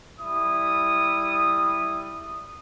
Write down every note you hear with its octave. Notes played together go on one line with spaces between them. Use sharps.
G3 E4 D#6